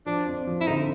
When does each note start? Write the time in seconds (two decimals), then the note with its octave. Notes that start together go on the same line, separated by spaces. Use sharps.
0.06 F3 D4
0.27 F2
0.47 F3
0.60 E4
0.67 D3 D#4